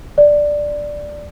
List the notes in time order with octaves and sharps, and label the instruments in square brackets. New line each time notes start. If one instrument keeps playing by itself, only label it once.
[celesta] D5